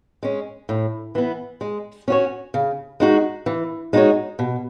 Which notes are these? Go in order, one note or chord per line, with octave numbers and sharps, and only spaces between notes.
G#3 C#4
A2
E3 B3
G#3
C#4 F#4 C#5
C#3
G#3 D#4 F#4
E3
G#3 D#4 F#4 C#5
B2